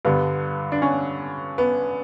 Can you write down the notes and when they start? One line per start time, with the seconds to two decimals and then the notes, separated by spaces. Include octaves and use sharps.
0.05 G2 D3 G3 B3
0.72 D4
0.82 C#4
1.58 B3